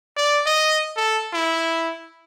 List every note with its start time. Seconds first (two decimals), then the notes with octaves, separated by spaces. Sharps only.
0.17 D5
0.46 D#5
0.97 A4
1.33 E4